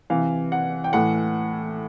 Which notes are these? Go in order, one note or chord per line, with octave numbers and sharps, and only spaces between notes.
C3 E3 F5
F#5
G5
A2 E3 F#5